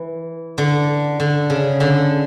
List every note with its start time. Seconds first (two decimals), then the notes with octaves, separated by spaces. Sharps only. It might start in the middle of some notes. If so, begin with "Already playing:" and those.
Already playing: E3
0.58 D3
1.20 D3
1.50 C#3
1.80 D3